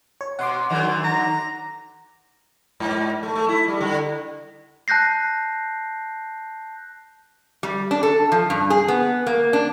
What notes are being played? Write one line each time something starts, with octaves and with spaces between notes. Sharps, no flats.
C#5
B2 F#5 C6 D6
D3 D#3 F#3
A#5
G#2
A3
A3
E4
G3
D3
A5 F#6 G6 A#6 C7
G3
D4
A4
F3
G2
G#4
B3
A#3
D4